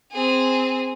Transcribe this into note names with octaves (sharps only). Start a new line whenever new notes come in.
C4 G#4